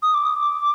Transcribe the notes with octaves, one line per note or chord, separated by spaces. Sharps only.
D#6
D6